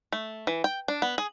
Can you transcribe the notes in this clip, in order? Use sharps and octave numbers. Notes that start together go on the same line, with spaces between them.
A3
E3
G5
D4
B3
G#4